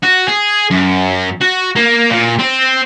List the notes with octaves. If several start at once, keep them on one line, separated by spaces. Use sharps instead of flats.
F#4
G#4
F#2
F#4
A#3
A#2
C4